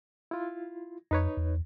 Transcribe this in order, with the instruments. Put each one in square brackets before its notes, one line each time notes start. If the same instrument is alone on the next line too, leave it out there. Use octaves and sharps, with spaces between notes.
[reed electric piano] E4 F4
[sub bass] F2 [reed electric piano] D#4 B4 C#5
[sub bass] E2